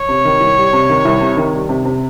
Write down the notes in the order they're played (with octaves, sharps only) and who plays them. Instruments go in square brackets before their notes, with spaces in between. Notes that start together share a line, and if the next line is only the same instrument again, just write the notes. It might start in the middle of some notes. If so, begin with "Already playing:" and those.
Already playing: [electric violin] C#5
[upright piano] C3
D#3
C2
G3
C3
D#3
C2
C3
D#3
G3
C3
C3